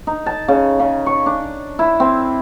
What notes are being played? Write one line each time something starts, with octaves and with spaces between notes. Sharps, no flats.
D#4
A5
C#3
C#3
C#6
D4
E4
C4